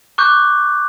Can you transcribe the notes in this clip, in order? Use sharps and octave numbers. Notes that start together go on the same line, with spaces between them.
C#6 D6 F#6 G6